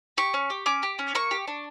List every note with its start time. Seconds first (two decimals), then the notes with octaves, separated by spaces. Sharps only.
0.18 G4 C#6
0.34 C#4
0.50 G4
0.66 C#4 D6
0.83 G4
0.99 C#4
1.15 A#3 C#6
1.31 G4
1.48 D4